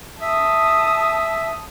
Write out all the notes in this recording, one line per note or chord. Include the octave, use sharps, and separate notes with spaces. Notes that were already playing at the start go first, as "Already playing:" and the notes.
E5 A5 D#6